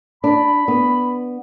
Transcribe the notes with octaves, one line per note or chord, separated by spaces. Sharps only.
D4 B5
B3